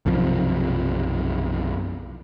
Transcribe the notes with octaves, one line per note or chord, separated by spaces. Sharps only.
B1 F#2 C3 F3